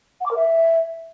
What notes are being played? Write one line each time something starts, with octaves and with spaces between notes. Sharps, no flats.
F#5
D6
A#4
E5